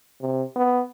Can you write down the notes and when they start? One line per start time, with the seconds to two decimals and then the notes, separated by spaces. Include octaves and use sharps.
0.21 C3
0.56 B3